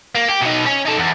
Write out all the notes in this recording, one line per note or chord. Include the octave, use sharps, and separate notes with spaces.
A#3
G4
B2 D#4
C#4
D#4 A4
E2